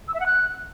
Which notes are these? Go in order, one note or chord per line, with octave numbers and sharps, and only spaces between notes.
E6
E5
F#5
F#6